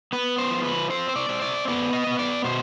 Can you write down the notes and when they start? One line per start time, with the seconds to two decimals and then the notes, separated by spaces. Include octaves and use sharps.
0.13 B3 B4
0.38 C5
0.51 F3
0.64 B4
0.90 C4 C5
1.09 C5
1.16 D5
1.29 C4
1.42 D5
1.68 B3 D5
1.93 D#5
2.07 B3
2.19 D5
2.44 B2 C5